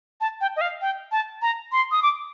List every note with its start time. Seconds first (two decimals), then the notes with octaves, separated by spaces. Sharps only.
0.21 A5
0.41 G5
0.56 D#5
0.61 F5
0.81 G5
1.12 A5
1.42 A#5
1.72 C6
1.91 D#6
2.03 D6